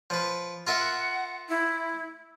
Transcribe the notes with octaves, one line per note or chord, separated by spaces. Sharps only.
F3 B4
F4 A#4 E5 F#5
E4